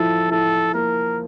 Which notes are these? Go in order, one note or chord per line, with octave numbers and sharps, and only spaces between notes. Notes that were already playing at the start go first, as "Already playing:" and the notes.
Already playing: F3 E4 A4
E4 A4
A#3 A#4